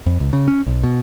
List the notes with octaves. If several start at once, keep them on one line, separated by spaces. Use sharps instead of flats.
F2
C#2
C#3
C#4
B1
B2